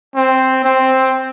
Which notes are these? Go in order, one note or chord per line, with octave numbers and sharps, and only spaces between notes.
C4
C4